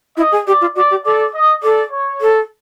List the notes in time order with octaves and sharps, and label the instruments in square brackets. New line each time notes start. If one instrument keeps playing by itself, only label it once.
[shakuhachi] E4 [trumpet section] D#5
[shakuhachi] G#4
[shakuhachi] G4 [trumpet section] D5
[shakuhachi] F4
[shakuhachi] F#4 [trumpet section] D5
[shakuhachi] G4
[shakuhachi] A4 [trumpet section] D5
[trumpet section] D#5
[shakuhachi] A4 [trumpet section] D5
[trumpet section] C#5
[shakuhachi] A4